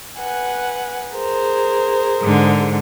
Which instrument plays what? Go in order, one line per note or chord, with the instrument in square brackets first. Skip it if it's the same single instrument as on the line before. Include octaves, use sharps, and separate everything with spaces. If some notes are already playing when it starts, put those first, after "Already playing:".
[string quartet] B4 F#5 G#5
G#4 A#4 C5
[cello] G#2 D3